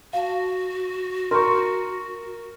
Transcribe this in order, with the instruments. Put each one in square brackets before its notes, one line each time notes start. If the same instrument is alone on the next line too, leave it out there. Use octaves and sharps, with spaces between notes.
[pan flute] F#4 [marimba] F5 A5
[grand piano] A#4 C#6 [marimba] C6 F6 G6